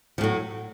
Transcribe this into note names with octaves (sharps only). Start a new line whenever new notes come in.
A2 F3 F#3